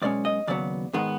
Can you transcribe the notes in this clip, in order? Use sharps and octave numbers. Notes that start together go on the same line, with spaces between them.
B1 B2 G#3 C#4 D5
D#5
D#2 C#3 F#3 B3 D5
G#2 D#3 G#3 B3